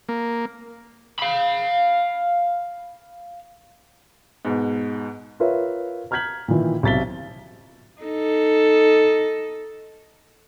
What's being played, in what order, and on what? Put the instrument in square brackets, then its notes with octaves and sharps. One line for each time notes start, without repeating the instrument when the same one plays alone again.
[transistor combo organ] A#3
[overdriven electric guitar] F5 B5
[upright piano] G#2 B2
[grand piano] F4 A#4 B4 C#5 E5
A#5 F6 G6 G#6 B6 F#7
A#2 D#3 E3
B1 C3 A6 B6 G7
[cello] D#4 A4